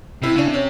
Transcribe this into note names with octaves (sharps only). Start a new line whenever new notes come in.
C3 E4
C#3 D4
C3
C#4